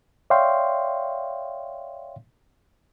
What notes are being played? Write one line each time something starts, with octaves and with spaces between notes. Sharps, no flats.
C#5 D5 E5 F5 G5 C6